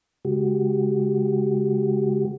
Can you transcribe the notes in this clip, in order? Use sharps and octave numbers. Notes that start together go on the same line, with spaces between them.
C#3 G#3 F#4 G4